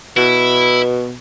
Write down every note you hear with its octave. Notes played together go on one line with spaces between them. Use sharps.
B2 E4